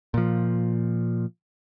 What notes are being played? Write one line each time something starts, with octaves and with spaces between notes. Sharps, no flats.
A#2 F3